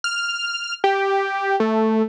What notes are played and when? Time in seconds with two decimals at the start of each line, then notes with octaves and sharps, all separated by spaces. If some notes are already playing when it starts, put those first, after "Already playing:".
0.04 F6
0.84 G4
1.60 A3